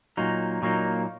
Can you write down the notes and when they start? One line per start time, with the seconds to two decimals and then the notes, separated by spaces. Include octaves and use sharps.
0.17 A#2 F#3 A#3 D#4
0.62 A#2 F#3 A#3 D#4